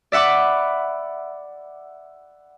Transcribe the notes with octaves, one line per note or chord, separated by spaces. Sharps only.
D5 E5 F#5 B5 D6